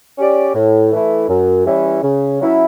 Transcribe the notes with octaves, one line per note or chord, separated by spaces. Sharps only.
C#4 G4 D5
A2
E3 A3 E4
F#2
E3 G3 C#4 E4
C#3
F#3 C#4 E4